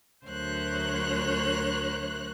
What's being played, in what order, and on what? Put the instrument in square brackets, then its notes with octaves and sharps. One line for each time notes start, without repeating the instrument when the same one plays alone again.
[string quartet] D2 F#3 A#4 C5 C#5 F#6